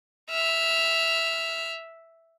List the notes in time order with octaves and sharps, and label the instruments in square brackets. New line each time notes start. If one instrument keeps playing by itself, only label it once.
[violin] E5 F6